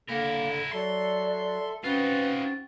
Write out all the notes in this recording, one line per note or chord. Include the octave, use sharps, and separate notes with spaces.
D3 A#3 E4 A#4
F#3 A4 D5 E5 C6
C4 C#4 D#4 F4 F#4 B4